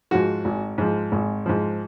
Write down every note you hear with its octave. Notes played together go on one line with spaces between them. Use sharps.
G#2 F3 F#4
G#1
G#2 F3
G#1
G#2 F3